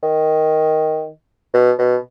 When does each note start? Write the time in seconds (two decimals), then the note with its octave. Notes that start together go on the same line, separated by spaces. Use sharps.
0.03 D#3
1.54 B2
1.79 B2